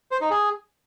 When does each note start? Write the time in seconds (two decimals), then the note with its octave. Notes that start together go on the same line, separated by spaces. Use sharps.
0.11 C5
0.21 D#4
0.31 G#4